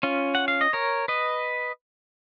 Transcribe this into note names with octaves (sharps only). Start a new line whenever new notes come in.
C#4 F4
F#5
F5
D#5
A#4 C#5
B4 D#5